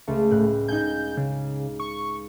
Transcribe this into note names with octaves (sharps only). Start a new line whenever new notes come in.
C#2 A3
A2 G5 F#6
D#4 G#5 G6
C#3
C#6